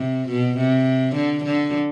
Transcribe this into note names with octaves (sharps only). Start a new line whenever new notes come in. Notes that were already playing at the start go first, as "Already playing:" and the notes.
Already playing: C3
B2
C3
D3
D3